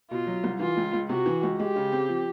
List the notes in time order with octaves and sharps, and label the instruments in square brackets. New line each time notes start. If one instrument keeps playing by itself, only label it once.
[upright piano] B2 [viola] F4
[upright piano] F#3
C2
[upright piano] E3 [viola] F4
[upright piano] C#2
C#2
[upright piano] C3 [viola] F#4
[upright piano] E3
C#2
[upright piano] G#3 [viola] G4
[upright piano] C#3
C4
F3